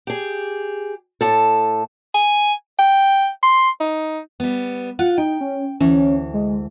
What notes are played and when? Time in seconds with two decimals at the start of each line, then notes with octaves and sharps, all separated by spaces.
0.07 G4 G#4
1.21 A2 A4
2.14 G#5
2.79 G5
3.43 C6
3.80 D#4
4.40 G3 B3
4.99 F4 F#5
5.18 D#4 G5
5.41 C#4
5.80 D2 E3 C#4
6.34 G#3